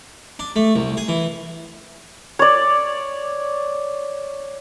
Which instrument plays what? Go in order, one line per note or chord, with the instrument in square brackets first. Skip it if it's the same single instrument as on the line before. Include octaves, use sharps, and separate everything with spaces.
[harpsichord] D4
A3
C2
G#4
E3
[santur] C#5 D5